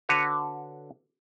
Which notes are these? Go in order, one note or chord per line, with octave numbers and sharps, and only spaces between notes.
D3 F#4 B4 C#5